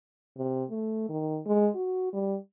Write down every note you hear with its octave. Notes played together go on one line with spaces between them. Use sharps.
C3
A3
D#3
G#3
F#4
G3